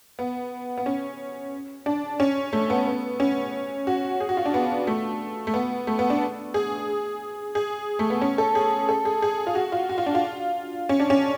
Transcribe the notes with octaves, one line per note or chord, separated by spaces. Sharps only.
B3
B3
C#4
D4
C#4
A3
B3
B3
C#4
F#4
G#4
F#4
F4
D4
B3
A3
A3
B3
A3
B3
D4
G#4
G#4
A3
B3
C#4
A4
G#4
A4
G#4
G#4
F4
F#4
F4
F#4
F4
D4
F4
C#4
D4
C#4